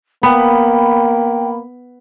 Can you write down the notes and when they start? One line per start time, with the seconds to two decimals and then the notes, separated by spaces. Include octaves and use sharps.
0.23 A#3 B3 G5 B5